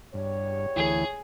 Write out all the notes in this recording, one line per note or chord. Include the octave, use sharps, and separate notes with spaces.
E2 G2 G4 C#5
D2 E3 E4 G#4